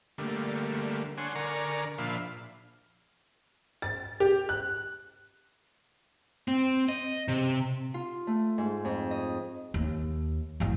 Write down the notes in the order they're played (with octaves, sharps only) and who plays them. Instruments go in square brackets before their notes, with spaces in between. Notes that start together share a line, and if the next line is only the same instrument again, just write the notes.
[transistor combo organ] D3 G3 A3 A#3
D4 C#5 F#5 G#5 C6
D3 A#4 D5 G#5 A#5 C#6
A#2 F3 D4 E5 F5 B5
[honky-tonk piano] A6
G4
F#6
[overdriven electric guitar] C4
D#5
C3
[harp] F4
A3
G#2
F2
D#5
[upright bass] D#2
A1 F#2